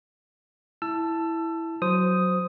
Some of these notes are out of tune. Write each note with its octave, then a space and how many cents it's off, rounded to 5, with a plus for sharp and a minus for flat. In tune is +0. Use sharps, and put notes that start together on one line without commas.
E4 +0 A5 +0 E6 +25
F#3 -10 C5 -10 D#6 +5